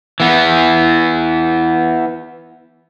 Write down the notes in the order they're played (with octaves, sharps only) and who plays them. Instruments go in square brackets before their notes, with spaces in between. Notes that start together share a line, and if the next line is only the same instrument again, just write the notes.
[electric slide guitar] E3 B3